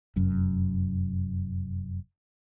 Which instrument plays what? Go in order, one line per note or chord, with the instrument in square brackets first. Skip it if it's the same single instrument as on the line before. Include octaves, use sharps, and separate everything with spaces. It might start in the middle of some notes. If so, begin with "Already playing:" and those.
[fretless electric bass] F1 F#2